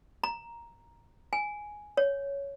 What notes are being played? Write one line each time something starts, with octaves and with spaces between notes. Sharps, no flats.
A#5
G#5
C#5